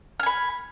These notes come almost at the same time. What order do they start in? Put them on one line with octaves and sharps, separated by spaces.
F6 G#5 B5